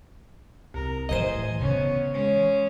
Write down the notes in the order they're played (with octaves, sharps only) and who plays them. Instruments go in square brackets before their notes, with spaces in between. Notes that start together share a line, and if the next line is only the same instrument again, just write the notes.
[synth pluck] C2 [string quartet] A#4
[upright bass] A2 E3 [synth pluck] C5 D#5 [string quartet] G#5
[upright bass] C#3 E3 [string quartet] B3 C#4
[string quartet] G#3 C#4